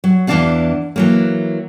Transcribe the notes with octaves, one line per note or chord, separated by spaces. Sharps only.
F#3
E2 E3 A#3 D4 F5 F#5
E3 F#3 A#3